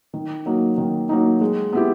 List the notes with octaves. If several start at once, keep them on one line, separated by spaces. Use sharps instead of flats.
D#3
F#3 A#3 D#4
D#3
F#3 A#3 D#4
G#3
B3 E4 G4